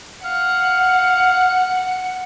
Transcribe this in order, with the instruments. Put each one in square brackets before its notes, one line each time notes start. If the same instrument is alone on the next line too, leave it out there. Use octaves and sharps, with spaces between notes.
[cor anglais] F5 [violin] F#5